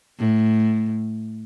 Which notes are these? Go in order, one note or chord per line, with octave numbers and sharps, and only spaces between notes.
A2